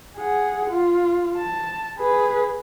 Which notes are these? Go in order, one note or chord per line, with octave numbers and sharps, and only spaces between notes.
G#4 F#5
F4
A5
G#4 B4